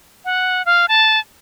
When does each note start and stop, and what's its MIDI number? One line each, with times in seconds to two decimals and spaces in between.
0.25 0.65 78
0.66 0.86 77
0.88 1.20 81